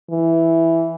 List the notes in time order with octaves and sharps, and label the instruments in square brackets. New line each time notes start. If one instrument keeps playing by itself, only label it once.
[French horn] E3